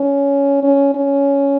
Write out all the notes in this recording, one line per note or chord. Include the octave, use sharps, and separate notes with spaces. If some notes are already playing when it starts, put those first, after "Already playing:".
Already playing: C#4
C#4
C#4